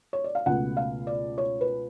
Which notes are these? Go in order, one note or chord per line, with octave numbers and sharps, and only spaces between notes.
C#5
D5
F5
C#2 B2 A3 F#5
F5
D5
C#5
B4